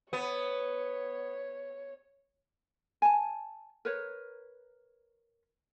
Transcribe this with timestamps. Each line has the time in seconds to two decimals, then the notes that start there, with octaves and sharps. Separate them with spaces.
0.13 B3 C#5
3.02 G#5 A5
3.85 A#4 B4 C#5